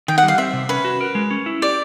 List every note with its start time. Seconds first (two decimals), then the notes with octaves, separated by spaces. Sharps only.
0.08 D#3 G5
0.18 F#5
0.23 G3
0.28 F5
0.38 C4 E5
0.53 C3
0.69 C#4 B4
0.85 F#4
1.01 A#4
1.15 G#3
1.31 C#4
1.46 E4
1.62 G4 D5